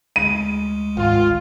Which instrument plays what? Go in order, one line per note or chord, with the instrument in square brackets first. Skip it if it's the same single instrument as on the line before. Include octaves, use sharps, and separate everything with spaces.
[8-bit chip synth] D2 G#3 [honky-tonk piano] D#7
[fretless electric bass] G#1 [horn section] F4